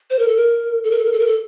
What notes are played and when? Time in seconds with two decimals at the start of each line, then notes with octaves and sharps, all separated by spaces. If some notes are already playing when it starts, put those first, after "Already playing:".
0.10 C5
0.19 A#4
0.28 A4
0.37 A#4
0.84 A4
0.91 A#4
0.98 A4
1.05 A#4
1.12 A4
1.19 A#4
1.27 A4